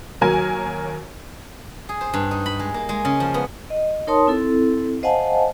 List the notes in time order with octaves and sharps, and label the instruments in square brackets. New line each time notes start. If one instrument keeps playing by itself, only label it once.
[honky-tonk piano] D#2 F#3 A#4 G#5
[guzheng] G#4
C5
G2
D#4
B5
G#3
A#3
G#3
C#3
F3
B3
[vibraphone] D#5
D#4 A#4 C#5 A5 C6 D#6
C4 E4 A4
C5 D#5 F5 F#5 G#5 A5